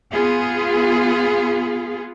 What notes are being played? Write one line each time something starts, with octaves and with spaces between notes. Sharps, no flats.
B3 F4 G#4